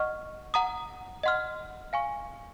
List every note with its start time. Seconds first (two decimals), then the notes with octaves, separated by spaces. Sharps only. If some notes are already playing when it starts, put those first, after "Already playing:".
Already playing: D#5 F#5 C#6 F6
0.54 F#5 A#5 D#6
1.23 D#5 F#5 C6 F6
1.93 F5 G#5 C#6